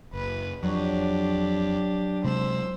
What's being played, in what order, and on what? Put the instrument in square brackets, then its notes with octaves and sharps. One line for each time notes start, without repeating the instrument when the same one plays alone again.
[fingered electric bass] F#1 [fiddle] B4
[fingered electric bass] F2 [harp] F#3 [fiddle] D4 G4
[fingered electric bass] C3 G#3 C4 [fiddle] C5 E6